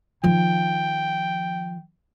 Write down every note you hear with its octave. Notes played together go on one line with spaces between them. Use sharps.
D#3 F3 G5